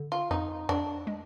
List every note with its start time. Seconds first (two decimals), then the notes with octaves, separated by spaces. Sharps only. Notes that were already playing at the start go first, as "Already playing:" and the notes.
Already playing: D3
0.12 F4
0.31 F2 D#4
0.69 F2 D4
1.07 G#3